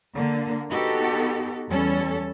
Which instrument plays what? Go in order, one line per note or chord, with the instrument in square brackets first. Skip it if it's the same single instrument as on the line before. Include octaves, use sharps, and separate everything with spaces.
[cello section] D3 A#3
B3 D#4 F#4 G4 A4
E2 G3 C#4 A4